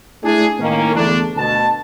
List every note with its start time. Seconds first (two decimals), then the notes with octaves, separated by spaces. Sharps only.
0.23 A3 D4 E4 G#4
0.60 A2 D#3 A#3 C#4
0.95 E2 D3 A3 D4
1.36 D2 B2 A5